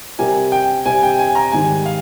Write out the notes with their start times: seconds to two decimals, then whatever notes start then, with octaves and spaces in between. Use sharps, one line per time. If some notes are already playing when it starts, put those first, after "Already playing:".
0.18 C3 G3 C4 G4 A#4 G#5
0.52 G5
0.86 C3 G3 C4 G4 G#5
1.03 G5
1.19 G#5
1.35 A#5
1.52 G#2 D#3 G3 G#5
1.86 F5